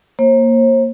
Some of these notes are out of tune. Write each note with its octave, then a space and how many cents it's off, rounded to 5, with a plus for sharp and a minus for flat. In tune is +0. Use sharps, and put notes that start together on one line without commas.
A#3 +0 C5 +45